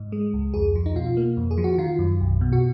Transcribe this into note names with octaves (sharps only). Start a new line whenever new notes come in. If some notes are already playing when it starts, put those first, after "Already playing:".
Already playing: G#2
G#3
C#2
F2 G#4
F3
D#4
B2 F4
A#3
F2
G#4
F3
F#4
D#3 F4
F#2
B1
B2
F#4